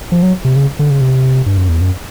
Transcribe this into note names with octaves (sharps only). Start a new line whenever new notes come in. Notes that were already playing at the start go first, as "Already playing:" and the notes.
F3
F#3
C3
C#3
D3
C#3
C3
G2
F#2
E2
F#2